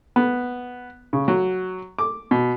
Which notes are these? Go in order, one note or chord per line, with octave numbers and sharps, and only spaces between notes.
B3
C#3
F#3
D6
B2